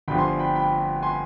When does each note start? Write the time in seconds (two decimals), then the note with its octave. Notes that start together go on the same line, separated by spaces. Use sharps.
0.08 G1 G2 F3 G5 B5
0.18 G#5 C6
0.39 G5 B5
0.55 G5 B5
1.03 G#5 C6